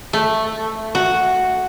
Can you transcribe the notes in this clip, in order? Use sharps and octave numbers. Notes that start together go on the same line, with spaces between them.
A3
F#4